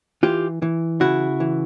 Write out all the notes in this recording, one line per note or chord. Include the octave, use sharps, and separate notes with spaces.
E3 F4 G4
E3
C#3 E4 F#4
E3